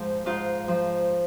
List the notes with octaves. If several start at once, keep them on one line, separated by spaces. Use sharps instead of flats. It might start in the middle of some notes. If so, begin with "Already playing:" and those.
Already playing: G#2 F3
G#2 F4
F3